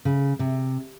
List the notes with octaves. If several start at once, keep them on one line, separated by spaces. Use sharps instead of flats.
C#3
C3